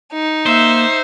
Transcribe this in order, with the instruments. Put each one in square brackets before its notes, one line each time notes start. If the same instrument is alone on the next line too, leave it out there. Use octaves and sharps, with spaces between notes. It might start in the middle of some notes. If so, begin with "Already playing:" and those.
[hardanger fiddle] D#4
[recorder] A#3 [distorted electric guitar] C5 [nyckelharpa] E5